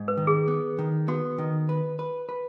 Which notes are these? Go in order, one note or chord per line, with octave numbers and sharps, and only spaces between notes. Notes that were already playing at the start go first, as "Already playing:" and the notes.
Already playing: G#2
B4
D#3
G#4
B3
D#3
B3 F#4
D#3
B4
B4
B4